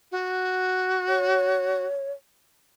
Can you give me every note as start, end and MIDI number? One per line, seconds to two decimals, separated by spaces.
0.11 1.85 66
1.08 2.12 73